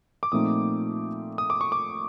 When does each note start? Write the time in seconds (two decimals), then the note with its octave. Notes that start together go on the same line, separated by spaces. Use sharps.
0.23 D6
0.32 A#2 F3 A3 C4 D#4 D#6
1.38 D#6
1.50 D6
1.61 C#6
1.72 D6